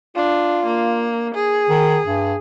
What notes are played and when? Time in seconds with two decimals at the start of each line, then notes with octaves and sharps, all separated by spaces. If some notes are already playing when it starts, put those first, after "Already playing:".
0.16 D4 F4
0.66 A#3
1.34 G#4
1.69 D#3
2.05 G2